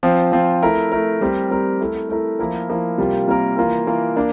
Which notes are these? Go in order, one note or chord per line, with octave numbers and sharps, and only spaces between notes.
F3 C4 F4
F3 C4 F4
A3 E4 A#4
A3 E4 A#4
G3 C4 G4 A#4
G3 C4 G4 A#4
A3 E4 A#4
A3 E4 A#4
F3 A#3 E4 A#4
F3 A#3 E4 A#4
C3 G3 A#3 F4 A#4
C3 G3 A#3 F4 A#4
E3 A#3 F4 A#4
E3 A#3 F4 A#4
A#3 D4